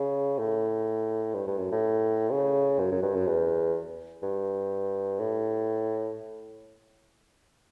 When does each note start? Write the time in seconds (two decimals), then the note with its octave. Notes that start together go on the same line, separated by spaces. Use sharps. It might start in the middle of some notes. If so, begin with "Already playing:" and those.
Already playing: C#3
0.39 A2
1.35 G2
1.47 G2
1.59 F#2
1.72 A2
2.32 C#3
2.79 F#2
2.92 F#2
3.03 G2
3.15 F#2
3.27 E2
4.23 G2
5.20 A2